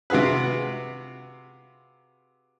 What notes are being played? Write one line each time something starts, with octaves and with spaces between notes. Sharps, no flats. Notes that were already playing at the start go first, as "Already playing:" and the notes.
C3 F4 F#4 G#4 B4